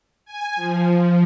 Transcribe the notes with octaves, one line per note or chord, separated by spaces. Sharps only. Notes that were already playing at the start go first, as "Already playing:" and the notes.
G#5
F3